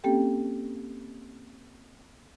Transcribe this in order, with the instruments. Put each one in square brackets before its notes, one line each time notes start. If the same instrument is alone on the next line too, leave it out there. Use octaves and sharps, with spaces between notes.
[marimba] A#3 C4 C#4 G4 A4 G5